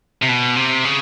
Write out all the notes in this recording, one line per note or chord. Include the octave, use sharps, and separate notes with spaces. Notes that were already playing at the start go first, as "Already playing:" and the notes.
C3
B2
C3
C#3